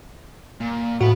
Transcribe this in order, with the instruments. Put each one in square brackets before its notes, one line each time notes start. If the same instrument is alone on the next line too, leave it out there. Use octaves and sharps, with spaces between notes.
[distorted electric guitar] A#2
[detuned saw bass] A2 [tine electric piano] F#4 [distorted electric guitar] F#5 B5